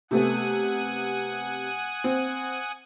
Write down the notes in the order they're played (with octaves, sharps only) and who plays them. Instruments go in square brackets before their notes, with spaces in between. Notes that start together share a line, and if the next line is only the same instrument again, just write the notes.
[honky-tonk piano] C3 A3 B3 [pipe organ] F#5 G#5 D#6
[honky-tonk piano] C4